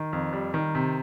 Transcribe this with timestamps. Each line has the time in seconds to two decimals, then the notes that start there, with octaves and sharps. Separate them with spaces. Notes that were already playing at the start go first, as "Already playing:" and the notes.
Already playing: D#3
0.13 F2
0.33 G3
0.54 D#3
0.75 C3